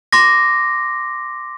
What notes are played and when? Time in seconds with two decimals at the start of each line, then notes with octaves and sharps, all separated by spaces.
0.13 C6 D6 A#6